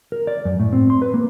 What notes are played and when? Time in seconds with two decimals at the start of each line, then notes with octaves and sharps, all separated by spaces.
0.12 A#4
0.27 D5
0.45 F#2
0.60 A2
0.72 C4
0.90 C6
1.02 B4
1.14 A#3